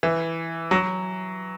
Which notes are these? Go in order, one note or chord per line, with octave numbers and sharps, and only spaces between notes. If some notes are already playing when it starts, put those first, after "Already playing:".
E3
F#3